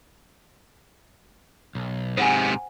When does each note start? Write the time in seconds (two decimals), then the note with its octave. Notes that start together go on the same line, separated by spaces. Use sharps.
1.75 B1
2.17 G#2 C3 B3 C5 F#5 G#5